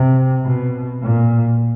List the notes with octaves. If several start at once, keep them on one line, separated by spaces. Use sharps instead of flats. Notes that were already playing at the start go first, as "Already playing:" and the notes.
Already playing: C3
B2
A#2